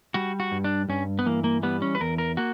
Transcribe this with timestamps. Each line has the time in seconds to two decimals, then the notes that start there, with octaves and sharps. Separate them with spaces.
0.14 G3 F#4
0.40 F#4
0.52 G2
0.64 D4
0.89 G2 C#4
1.19 B3
1.26 E3 A#3
1.44 A#3
1.63 G3 B3
1.82 C#4
1.95 B4
2.01 E2 A#4
2.18 A#4
2.37 A#3 F#4